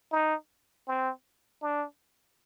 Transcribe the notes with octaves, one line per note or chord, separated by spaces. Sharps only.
D#4
C4
D4